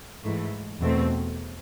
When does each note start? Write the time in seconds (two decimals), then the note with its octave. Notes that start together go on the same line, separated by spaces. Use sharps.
0.23 G#2 E3 A3
0.81 E2 B2 A3 C4